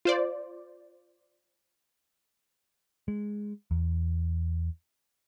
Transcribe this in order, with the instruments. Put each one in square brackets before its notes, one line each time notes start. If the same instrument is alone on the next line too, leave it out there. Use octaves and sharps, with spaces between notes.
[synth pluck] F4 C5 D5
[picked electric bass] G#3
E2